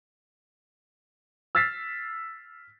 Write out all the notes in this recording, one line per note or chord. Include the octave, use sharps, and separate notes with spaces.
E6 F6 A6 B6 C7